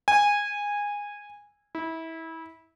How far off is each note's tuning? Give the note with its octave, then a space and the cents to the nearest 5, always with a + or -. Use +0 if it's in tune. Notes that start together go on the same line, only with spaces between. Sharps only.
G#5 -15
E4 -25